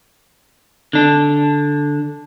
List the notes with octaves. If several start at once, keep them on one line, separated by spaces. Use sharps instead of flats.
D3 D4